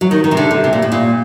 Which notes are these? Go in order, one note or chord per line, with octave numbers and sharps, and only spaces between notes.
F#3
D#3
D#3
C3
D3
C3
C3
A#2
A2
A#2